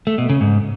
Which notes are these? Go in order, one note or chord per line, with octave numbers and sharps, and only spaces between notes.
A3
B2
C#3
G#2